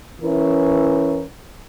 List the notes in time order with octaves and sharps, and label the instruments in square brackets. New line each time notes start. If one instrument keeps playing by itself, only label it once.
[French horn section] E3 C#4 E4 A#4